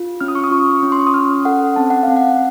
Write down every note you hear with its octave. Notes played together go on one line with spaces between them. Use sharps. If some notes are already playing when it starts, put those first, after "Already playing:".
Already playing: F4
C#4 F6
D#6
C#6
D#6
F4 C#6
C#4
C6
C#6
D#6
C#4 F6
A4 F#5
C4 A5
F#5
C4 F5
F#5